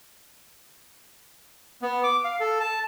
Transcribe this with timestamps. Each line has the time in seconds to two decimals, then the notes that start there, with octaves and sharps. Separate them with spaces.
1.82 B3
2.03 D6
2.24 F5
2.40 A4
2.60 A5